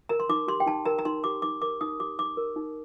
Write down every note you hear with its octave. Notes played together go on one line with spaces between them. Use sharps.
A#4 A#5
C6
D#4 D6
G4 C6
G5
D#4 A5
A#4 A#5
A#5
D#4 C6
G4 D6
D#4 D6
A#4 D6
D#4 D#6
G4 D6
D#4 D6
A#4
D#4